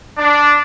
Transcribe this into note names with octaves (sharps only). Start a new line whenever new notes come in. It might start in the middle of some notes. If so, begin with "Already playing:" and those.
D4